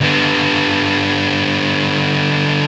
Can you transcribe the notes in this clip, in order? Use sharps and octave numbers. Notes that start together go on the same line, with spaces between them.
D3 B3